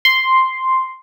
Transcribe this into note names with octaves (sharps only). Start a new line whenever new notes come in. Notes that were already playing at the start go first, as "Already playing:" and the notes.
C6